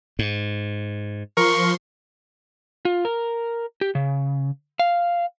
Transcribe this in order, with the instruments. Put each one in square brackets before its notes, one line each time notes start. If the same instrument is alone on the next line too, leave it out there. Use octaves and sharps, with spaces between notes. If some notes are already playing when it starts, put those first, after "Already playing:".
[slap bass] G#2
[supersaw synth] F3 C6 [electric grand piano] A#4 [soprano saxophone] C#6
[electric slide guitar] F4
A#4
G4
C#3
F5